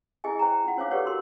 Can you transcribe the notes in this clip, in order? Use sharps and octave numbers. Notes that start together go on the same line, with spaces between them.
E4 G#4 D#5 E5 G#5
C5 G5 A#5
F4 F#5
D4 C5 C#5 F5 D6
G4 A4 B4 C#5 D5 F#5
F#4 A#4 C6